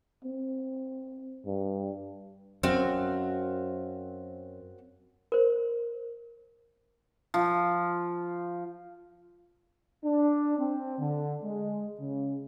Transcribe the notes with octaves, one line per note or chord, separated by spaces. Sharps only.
C4
G2
F#2 C4 F#4 F5
A#4 C5
F3
D4
C4
D3
G#3
C#3